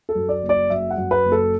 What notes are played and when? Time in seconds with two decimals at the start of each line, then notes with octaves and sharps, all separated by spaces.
0.09 A4
0.15 F#2
0.29 D5
0.42 F#1
0.49 D5
0.70 F#2 E5
0.90 F#5
0.98 F#2
1.11 B4
1.25 F#1
1.32 A4